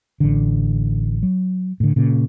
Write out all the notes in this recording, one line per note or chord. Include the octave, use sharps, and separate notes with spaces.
A1 D3
F#3
A2 D3
A#2 C#3